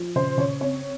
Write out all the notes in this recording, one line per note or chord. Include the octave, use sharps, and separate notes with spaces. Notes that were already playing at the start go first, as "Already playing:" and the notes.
Already playing: F3
C#3 C5
C#3 C#5
C4 C#5